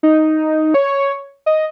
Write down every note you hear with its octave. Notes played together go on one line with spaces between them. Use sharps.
D#4
C#5
D#5